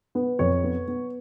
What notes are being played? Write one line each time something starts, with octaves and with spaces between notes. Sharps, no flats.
B3
F2 C#5
B3
B3